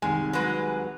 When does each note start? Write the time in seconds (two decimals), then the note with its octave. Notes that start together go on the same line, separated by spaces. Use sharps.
0.02 C2 D#3 G#3 G#5
0.33 F#3 G#3 B4